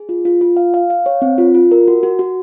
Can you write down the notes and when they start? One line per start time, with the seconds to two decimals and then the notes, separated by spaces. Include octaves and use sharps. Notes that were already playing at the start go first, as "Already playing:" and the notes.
Already playing: G#4
0.09 F4
0.25 F4
0.41 F4
0.57 F5
0.74 F5
0.90 F5
1.06 C#5
1.22 C4
1.38 F4
1.54 F4
1.72 A#4
1.88 F#4
2.03 F#4
2.19 F#4